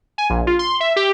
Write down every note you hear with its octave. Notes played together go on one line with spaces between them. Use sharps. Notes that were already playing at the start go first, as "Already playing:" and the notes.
G#5
A#1
F4
C6
E5
G4